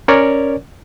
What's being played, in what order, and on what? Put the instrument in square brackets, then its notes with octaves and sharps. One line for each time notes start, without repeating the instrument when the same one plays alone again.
[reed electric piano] C#4 A#4 C#5 D5